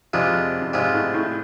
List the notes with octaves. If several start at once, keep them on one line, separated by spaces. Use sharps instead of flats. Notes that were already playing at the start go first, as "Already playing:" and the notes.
F2 C3 G#3 D4 F4
F2
G#2 C3 G#3 D4 F4
A2
A2